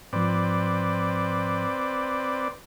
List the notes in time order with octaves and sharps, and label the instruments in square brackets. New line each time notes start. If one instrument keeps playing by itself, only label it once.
[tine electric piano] G#2 F3 [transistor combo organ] C4 B4 D5